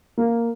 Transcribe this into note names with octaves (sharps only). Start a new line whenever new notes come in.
A#3